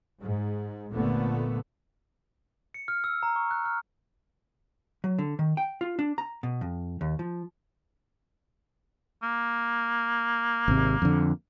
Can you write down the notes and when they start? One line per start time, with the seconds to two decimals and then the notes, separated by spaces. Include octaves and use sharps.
0.20 G#2
0.93 F1 A#2 D3 A3 B3
2.74 C#7
2.88 F6
3.04 E6
3.23 A#5
3.36 C#6
3.51 F#6
3.66 F6
5.04 F#3
5.18 D3
5.39 D#3
5.57 G5
5.81 F4
5.99 D4
6.18 A#5
6.43 B2
6.61 F2
7.01 D#2
7.19 F3
9.23 A#3
10.68 G#1 C3
11.02 F2 D3